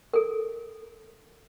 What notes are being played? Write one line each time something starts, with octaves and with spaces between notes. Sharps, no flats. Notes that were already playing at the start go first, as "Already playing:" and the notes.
A4 A#4